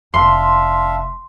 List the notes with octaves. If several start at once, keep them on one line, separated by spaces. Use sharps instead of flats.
F1 D4 E5 F5 C6